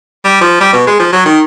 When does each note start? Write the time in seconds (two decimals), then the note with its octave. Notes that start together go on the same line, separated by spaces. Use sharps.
0.25 G3
0.41 F3
0.61 G3
0.73 B2
0.87 G#3
0.99 F3
1.13 F#3
1.25 D#3